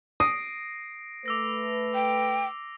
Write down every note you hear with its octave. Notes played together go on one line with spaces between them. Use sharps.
D#6 A#6 C7 D7
A3 B4 D6 E6 A#6
G5